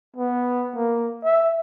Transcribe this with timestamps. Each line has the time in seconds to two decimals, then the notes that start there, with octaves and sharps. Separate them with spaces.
0.16 B3
0.76 A#3
1.25 E5